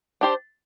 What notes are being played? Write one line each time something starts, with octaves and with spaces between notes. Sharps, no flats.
D4 G4 C5